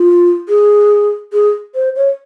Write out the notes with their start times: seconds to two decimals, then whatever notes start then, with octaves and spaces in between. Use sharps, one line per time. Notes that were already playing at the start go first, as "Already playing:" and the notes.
Already playing: F4
0.49 G#4
1.33 G#4
1.75 C5
1.96 C#5